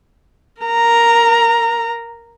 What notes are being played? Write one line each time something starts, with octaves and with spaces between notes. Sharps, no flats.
A#4 A#5